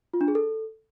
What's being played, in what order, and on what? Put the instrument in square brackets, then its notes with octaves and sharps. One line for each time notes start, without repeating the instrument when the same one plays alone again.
[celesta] F4
D4
G#4
A4